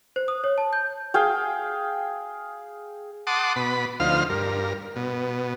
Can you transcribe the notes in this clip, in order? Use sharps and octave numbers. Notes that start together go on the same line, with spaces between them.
C5
D#6
C#5
A5
G6
G#4 F5 G5
F#5 A5 C6 D6 D#6
B2 B5
D2 F3 D#4 C5 F5 F6
G2 A#4
B2